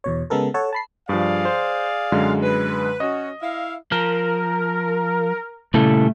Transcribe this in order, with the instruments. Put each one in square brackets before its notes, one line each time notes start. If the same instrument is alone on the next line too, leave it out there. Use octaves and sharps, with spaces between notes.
[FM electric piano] E2 B2 C#5
C#3 G#3 B3 A4 A#4
A4 C#5 F#5 A5
A5 B5 C7
[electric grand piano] G2 F3 [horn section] G#4 D5 F5
[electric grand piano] C5
F#2 D3 G#3
[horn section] B4
[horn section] C#4 F#4 [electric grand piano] D#5
[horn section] E4 E5 F5
[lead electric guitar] F3 [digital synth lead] A#4
[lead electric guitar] A#2 G3 [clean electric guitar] C#3 E4 A4 [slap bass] A3